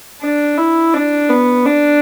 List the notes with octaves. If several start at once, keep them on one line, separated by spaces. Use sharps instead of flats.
D4
E4
D4
B3
D4